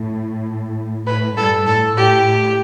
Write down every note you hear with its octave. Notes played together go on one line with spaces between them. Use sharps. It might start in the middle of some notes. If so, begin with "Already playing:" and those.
Already playing: A2
A2 B4
G2 A4
A2 A4
A2 G4
A2